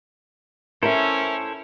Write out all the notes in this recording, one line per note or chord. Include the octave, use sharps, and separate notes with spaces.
C#4 E4 A4 A#4 C5 E5